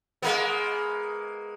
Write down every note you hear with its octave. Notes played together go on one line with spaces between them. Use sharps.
G#3 A#3 B3